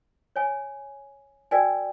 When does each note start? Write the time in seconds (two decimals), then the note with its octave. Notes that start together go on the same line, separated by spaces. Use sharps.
0.36 C#5 G#5
1.51 F#4 A#4 D5 G5 G#5